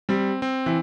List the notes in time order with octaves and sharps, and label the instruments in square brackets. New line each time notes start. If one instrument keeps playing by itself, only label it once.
[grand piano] G3 [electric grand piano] C4
[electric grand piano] C4
[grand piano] E3